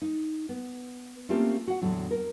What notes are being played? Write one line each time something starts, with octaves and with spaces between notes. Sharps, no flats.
D#4
B3
A3 A#3 C4 C#4 F4 G4
F#4 F#5
E2 A2 D3 F#3
A#4